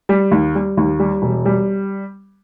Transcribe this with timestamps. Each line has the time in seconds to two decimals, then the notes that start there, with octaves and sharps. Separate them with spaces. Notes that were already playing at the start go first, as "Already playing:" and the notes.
0.09 G3
0.31 D#2
0.55 G3
0.77 D#2
0.99 G3
1.22 E1
1.45 G3